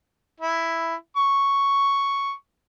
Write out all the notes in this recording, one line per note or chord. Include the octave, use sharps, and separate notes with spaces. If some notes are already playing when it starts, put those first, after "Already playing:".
E4
C#6